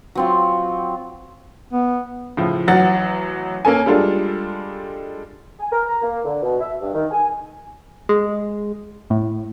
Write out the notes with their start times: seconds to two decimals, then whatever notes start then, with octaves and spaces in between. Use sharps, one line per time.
0.15 F#3 C4 F4
1.73 B3
2.37 A2 C#3 F3
2.68 A1 F#3 F#5 A6
3.65 A#3 C#4 A4 G#5
3.86 G3 G#3 D4 F4 A4
5.60 G#5
5.72 A#4
5.86 A#5
6.02 A#3
6.25 D3
6.42 B2
6.61 E5
6.81 G2
6.94 D#3
7.11 G#5
8.09 G#3
9.10 A2